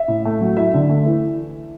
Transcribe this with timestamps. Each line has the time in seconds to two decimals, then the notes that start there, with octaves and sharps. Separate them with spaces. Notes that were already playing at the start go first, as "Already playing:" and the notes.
Already playing: E5
0.08 A2
0.25 A3
0.41 F#3
0.57 E4 E5
0.74 D3
0.89 A3
1.06 E3